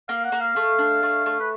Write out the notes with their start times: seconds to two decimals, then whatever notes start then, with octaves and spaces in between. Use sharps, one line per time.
0.08 A#3 F5
0.24 F#5
0.32 A#3
0.41 F5
0.56 A3
0.79 D4
1.03 A3
1.26 A3
1.40 B4